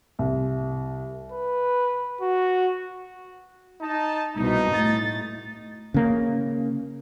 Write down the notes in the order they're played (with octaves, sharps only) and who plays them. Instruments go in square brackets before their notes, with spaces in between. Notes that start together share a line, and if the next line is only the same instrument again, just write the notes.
[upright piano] C2
[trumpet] B4
F#4
[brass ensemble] D#4 A5
[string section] C2 B2 [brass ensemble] D#4
[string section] A2 A6
[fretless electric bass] C#3 A#3